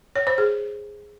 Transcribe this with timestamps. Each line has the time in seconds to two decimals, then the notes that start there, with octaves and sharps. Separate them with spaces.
0.16 C#5
0.27 C5
0.38 G#4